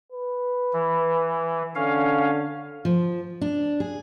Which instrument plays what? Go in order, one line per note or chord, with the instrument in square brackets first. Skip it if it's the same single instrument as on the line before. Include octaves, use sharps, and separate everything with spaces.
[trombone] B4
[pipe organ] E3
[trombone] D3 [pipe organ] C#4 F5
[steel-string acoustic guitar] F3
D4
G#4